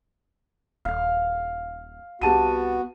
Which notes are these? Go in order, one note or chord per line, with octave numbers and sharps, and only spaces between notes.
D#1 F5
C2 B3 F#4 G4 A5 D#7